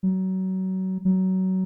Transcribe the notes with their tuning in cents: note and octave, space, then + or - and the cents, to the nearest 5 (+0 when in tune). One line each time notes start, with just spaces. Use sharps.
F#3 +25
F#3 +20